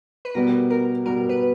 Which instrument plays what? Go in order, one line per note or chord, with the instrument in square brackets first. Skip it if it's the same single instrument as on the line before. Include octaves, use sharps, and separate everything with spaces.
[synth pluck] B4
[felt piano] B2 G3 B3 [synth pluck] A#4
[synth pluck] A#4
[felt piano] B2 G3 B3 [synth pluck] A#4
[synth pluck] B4